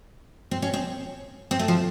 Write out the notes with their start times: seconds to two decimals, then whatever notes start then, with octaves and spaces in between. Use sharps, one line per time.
0.51 C4
0.62 C#4
0.74 C4
1.51 C4
1.59 A3
1.68 F3